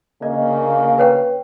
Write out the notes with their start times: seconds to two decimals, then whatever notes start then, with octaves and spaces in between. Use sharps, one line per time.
0.22 D2 C#3 A#3 D#5
0.98 B4 C#5 G5